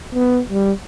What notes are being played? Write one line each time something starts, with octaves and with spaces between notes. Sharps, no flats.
B3
G3